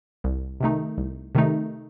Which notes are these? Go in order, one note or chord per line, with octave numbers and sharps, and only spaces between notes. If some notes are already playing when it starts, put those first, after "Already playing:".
C2
C3 D#3 A3 D#4
C2
C3 D#3 A3 D#4